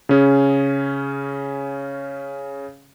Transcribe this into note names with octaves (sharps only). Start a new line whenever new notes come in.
C#3 C#4 G#4